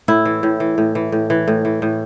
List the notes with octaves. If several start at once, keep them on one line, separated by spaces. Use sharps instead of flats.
A2 E4
E3
A2
E3
A2
E3
A2
E3
A2
E3
A2